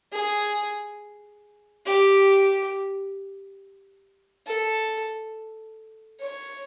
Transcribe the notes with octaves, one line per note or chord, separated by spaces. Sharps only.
G#4
G4
A4
C#5